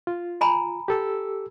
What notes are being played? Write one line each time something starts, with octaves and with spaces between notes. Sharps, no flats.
F4
G#5 A#5 B5
G4 A4 E6